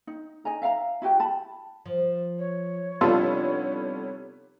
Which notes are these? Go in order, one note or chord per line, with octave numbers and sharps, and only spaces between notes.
D#4
D#4 D#5 G#5 A#5
E5 F5 G5 A#5
E4 F#4 G4 G5
A5 B5
F3
C#5
C3 G3 B3 D4 D#4 F4 G4 A4